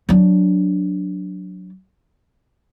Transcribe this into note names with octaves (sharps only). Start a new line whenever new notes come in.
F#3 D4